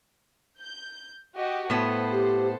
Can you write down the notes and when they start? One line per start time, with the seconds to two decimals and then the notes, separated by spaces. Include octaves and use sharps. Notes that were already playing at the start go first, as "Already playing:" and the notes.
0.58 G6
1.37 F#4 G4 D#5
1.70 A2 B3 A4 C5
2.12 G4